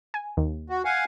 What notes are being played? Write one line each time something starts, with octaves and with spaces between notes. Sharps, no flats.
G#5
D#2
F#4
F5 F#5 G#5